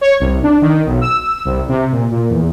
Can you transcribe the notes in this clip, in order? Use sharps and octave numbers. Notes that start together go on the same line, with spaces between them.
C#5
C2
D4
D#3
B1
E6
E6
C2
C3
A#2
A#2
E2